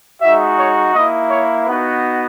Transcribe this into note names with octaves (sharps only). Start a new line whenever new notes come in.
G#3 D#4 F#4 E5
C#5
A#3 E4 D#5
C#5
B3 D#4 F#4 B4